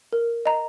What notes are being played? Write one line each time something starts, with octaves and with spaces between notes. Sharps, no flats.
A#4
D#5 A#5